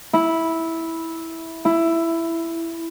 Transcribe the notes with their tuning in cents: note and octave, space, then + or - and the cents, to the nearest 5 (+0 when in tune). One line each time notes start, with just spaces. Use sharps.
E4 -10
E4 +10